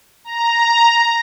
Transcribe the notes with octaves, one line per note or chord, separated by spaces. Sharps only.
A#5